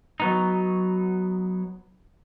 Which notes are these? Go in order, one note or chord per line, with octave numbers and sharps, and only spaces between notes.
F#3 B3 D#4